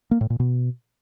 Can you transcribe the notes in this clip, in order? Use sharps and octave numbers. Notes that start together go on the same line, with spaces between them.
A#3
A2
A#2
B2